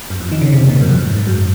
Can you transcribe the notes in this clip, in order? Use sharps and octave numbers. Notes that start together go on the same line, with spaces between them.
F#2
F2
D#3
C#3
C3
A#2
F#2
F2
F#2
G#2
G#2
F#2